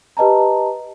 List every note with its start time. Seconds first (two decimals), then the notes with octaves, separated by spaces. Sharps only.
0.17 G4 B4 D#5 A5 A#5